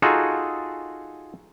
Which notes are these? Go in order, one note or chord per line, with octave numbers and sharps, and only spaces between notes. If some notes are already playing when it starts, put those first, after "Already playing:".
D#4 F4 F#4 G#4 A4